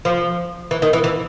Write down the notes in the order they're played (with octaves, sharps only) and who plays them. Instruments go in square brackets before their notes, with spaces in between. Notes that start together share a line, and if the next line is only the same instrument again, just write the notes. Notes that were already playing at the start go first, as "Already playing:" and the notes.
[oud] F3
E3
D#3
E3
E3